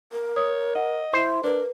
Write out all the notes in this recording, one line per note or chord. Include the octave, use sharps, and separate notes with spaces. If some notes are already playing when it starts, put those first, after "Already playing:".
A#4
C#5 D#6
D#5 F#5
E4 C5
D4 A#4 B4